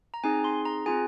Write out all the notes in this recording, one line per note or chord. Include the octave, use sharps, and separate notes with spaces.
A#5
C4 D#4 G#4 G#5
C6
A#5
C4 F4 G#4 G#5